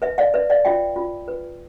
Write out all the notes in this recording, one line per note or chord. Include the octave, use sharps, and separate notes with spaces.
B4 E5
D5 F5
B4 E5
D5 F5
F4 E5 G5
F4
B4